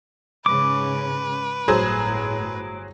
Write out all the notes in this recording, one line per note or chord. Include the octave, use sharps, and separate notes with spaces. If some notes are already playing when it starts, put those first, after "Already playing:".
G#2 C#3 C#4 B4 D6
G1 A2 F#3 G#4 C5